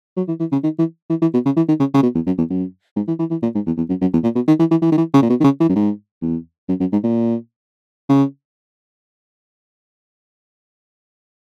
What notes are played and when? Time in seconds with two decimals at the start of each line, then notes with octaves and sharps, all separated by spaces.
0.17 F#3
0.28 E3
0.40 E3
0.52 C#3
0.63 D#3
0.79 E3
1.10 E3
1.21 E3
1.34 B2
1.45 C#3
1.57 E3
1.68 D#3
1.80 C#3
1.94 C#3
2.03 B2
2.15 E2
2.26 F#2
2.38 E2
2.50 F#2
2.96 G#2
3.08 E3
3.19 E3
3.30 E3
3.42 A#2
3.55 G#2
3.66 E2
3.77 E2
3.89 F#2
4.01 F#2
4.13 E2
4.24 A#2
4.35 B2
4.48 D#3
4.59 E3
4.71 E3
4.82 E3
4.92 D#3
4.98 E3
5.14 C#3
5.22 A#2
5.29 B2
5.40 D#3
5.44 C#3
5.60 E3
5.69 F#2
5.75 G#2
6.22 E2
6.69 F#2
6.80 F#2
6.92 G#2
7.04 A#2
8.09 C#3